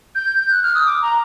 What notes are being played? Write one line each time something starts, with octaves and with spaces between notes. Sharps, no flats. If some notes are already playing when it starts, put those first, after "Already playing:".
G6
G6
F#6
F6
D#6
D6
A#5